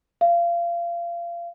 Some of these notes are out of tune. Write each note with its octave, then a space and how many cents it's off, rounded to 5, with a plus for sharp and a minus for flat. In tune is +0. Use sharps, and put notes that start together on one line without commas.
F5 -25